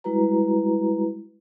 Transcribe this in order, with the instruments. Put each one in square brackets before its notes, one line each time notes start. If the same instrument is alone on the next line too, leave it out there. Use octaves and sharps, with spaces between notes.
[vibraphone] G3 G#3 E4 F#4 B4 A#5